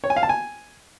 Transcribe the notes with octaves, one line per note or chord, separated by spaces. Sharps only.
C#5
G#5
F5
A5
G#5